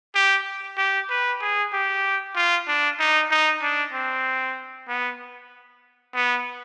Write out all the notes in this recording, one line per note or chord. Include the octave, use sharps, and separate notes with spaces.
G4
G4
B4
G#4
G4
F4
D4
D#4
D#4
D4
C4
B3
B3